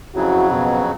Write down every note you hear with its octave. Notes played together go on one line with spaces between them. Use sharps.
F2 C#3 F#3 E4 F#4
B2